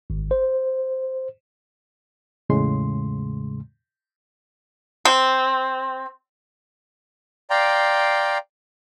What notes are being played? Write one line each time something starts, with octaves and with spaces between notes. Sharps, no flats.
G#1
C5
E2 A2 C#3 G#3 C6
C4
D5 F5 G5 A#5 C6